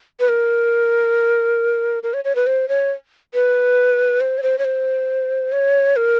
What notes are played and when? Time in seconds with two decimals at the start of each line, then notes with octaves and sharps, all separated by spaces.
0.20 B4
0.29 A#4
2.03 A#4
2.14 C#5
2.24 C#5
2.35 B4
2.47 C5
2.68 C#5
3.34 B4
4.21 C5
4.38 C#5
4.43 C5
4.58 C#5
4.65 C5
5.52 C#5
5.96 A#4